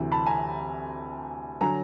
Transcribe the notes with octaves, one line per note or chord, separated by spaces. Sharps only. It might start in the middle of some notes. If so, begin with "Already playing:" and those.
Already playing: D2 C3 E3
A5 B5
G#5 A#5
D3 F#3 G#5 A#5